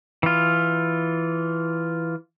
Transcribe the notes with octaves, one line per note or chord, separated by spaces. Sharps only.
E3 F4